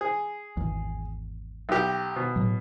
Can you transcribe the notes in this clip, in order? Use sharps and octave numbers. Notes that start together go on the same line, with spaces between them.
G#4
G#1 E2
B1 G4
B2
A2 F#3